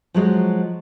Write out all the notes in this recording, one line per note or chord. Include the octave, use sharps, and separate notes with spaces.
F3 F#3 G#3